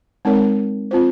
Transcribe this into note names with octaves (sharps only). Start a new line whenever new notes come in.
G#3 C4 D#4 A#4 C#5
C4 F4 C5